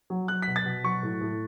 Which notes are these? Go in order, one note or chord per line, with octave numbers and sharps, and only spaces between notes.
F#3
F#3 F#6
B2 B6
A6
B2
F#3 C#6
A2
A2